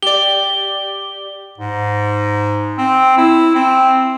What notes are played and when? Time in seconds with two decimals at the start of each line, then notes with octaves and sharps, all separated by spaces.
0.03 G4 D5 G7
1.58 G#2
2.78 C4
3.17 E4
3.55 C4